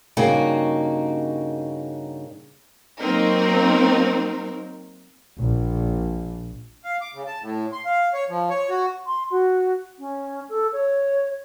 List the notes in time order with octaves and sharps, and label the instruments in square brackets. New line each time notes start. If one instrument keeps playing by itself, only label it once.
[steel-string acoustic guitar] G2 C#3 A#3 D#4 F#4
[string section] F#3 A#3 C4 D#4 A#4
A#1
[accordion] F5
D6
C#3
A5
A2
C6
F5
C#5
F3
C#5
F#4
[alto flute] C6
F#4
C#4
A4
C#5